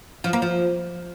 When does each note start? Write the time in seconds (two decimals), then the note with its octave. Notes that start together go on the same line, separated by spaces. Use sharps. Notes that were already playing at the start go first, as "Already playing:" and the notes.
0.24 F3
0.33 A#3
0.42 F3